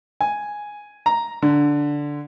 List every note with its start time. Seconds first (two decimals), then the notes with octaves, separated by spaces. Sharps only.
0.21 G#5
1.06 A#5
1.42 D3